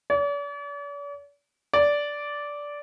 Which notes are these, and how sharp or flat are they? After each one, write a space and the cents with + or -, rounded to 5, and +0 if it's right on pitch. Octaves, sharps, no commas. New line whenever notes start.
D5 -45
D5 -10